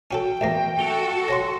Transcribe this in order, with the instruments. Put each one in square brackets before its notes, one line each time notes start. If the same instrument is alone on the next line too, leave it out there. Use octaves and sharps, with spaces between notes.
[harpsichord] C#4 F#4 A4 [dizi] G5
[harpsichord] A1 E2 A#3 [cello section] B2 [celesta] E5 A#6
[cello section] F#4 A4 [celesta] D7 F7 G7
[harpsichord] C#5 F#5 C#6 [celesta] C6 A#6